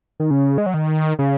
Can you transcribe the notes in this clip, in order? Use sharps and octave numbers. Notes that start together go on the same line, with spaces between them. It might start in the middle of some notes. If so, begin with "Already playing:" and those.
D#3
C#3
G#3
F#3
D#3
C#3